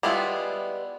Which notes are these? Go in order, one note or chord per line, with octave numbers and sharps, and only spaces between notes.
G3 G#3 B3 E4 F4